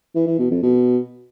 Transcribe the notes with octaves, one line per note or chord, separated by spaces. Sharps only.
E3
E3
B2
F2
B2